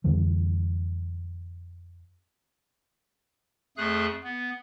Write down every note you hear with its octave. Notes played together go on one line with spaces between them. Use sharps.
F2 D3 E3 G3
F2 A3 G#4 F#6
B3